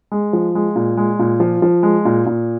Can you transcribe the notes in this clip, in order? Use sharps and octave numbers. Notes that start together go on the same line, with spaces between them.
G#3
F3
G#3
A#2
G#3
A#2
F3
F3
G#3
A#2
A#2